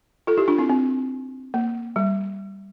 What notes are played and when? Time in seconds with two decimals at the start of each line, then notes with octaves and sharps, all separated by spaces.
0.27 F4 A4
0.37 E4 G4
0.48 D4 F4
0.58 C4 E4
0.69 C4
1.54 A#3
1.96 G3